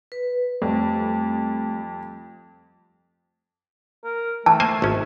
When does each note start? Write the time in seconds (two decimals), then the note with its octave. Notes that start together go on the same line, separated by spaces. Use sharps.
0.12 B4
0.62 F2 G3 A3
4.04 A#4
4.46 E3 A3 A5
4.60 A#3 C5 G#5
4.82 G#1 C#4